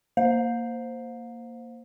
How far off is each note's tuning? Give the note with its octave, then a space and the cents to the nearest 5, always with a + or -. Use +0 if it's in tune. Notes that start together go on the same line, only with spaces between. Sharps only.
A#3 -5 C5 +0 F5 +40